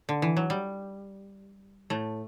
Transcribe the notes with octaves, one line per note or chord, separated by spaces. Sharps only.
D3
E3
F#3
G3
A2 A3